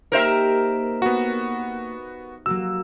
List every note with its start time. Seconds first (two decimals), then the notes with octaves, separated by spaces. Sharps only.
0.12 A#3 D#4 G4 A#4 C5 E5
1.02 B3 F#4
2.46 F#3 A#3 F#4 E6